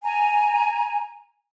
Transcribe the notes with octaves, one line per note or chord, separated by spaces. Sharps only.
G#5 A#5